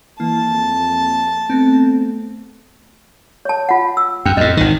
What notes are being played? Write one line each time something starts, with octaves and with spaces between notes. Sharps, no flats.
E3 A#3 A5
F2
A3 B3 C4
C#5 A5
F4 F#5
E6
F#2 G5
F2 A2 D#5
G#1 D#3